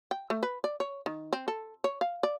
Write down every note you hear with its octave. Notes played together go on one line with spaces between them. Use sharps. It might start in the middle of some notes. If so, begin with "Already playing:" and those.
G5
A3
B4
D5
C#5
D#3
C4
A4
C#5
F5
D5